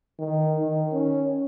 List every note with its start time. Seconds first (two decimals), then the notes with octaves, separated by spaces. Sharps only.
0.20 D#3
0.60 D#3
0.92 C#4